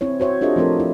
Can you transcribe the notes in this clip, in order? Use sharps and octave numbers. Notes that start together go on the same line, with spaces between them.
C4 E4 C#5
F#4 C5 C#5 E5
D4 F4 G4 A4 D#5 E5
F3 A3 C4 A4 A#4
E4